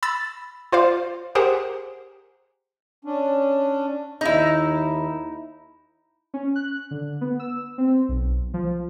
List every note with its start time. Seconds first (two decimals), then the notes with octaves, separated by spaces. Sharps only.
0.03 B5 E6 A6
0.72 F4 C5 D5 F5
1.35 G4 G#4 A#4 C5 F#5
3.05 C#4 D4
4.21 D#2 D#4 E4
6.34 C#4
6.56 F#6
6.91 D3
7.21 B3
7.40 E6
7.78 C4
8.09 B1
8.54 F3